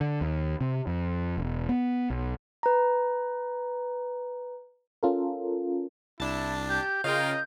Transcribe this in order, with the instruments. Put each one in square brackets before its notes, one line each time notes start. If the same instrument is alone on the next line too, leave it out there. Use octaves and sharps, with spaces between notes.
[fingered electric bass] D3
D#2
C3
F2
E1
B3
B1
[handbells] B4 A#5
[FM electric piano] C#4 F4 A4 A#4
[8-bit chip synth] C2 D4 [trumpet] E4 [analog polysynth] A5
[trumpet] G4 [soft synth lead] G6
[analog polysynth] C#3 F4 A#4 [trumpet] D#5 [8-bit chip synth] F5 G5